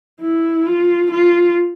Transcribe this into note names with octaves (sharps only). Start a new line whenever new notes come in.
E4
F4
F4